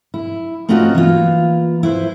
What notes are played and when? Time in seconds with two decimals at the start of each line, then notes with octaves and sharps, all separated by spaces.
0.14 E4
0.69 A3 C4 C#4 D#4 F4 F#4
0.94 E3 A#3 F4
1.83 E4 B4 C5